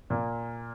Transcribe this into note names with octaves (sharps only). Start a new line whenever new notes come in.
A#2 A#3